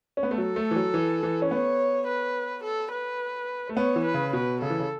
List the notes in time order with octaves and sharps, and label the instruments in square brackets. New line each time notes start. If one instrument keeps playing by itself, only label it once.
[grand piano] C#4
B3
A3
[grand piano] F#3 [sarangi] A4
[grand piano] A3
E3
F#3
E3
E3
C#4
[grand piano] B3 [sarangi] C#5
[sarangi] B4
A4
B4
[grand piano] A3
[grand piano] B3 [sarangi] C#5
[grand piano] E3
[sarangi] B4
[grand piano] C#3
[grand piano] B2 [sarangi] B4
[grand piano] C#3 [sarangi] A4
[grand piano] E3
C#3